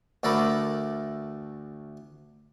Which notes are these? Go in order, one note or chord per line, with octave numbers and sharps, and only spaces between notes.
D2 A3 A4 A#4 B5 D6